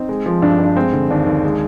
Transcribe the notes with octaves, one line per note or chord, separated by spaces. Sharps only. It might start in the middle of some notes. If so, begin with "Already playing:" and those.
Already playing: C4 D#4
G#3
F3
G2 D4
G2
D4
G#3 C4
D3
D#2 D4
D#2
G#3